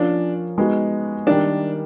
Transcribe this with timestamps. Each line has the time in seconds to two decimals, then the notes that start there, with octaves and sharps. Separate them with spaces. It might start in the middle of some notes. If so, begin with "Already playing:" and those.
Already playing: F3 A#3 C#4 D4 F4
0.58 G#3 B3 D#4 F#4
1.27 D#3 G3 A#3 D4